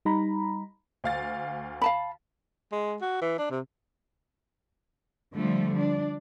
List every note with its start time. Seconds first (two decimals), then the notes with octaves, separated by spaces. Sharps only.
0.05 G3 D#4 A#5 B5
1.04 D2 F5 A6
1.82 F5 A5 B5
2.72 G#3
3.01 F#4
3.21 E3
3.38 D4
3.51 C3
5.35 D3 F3 G3 A3
5.78 D4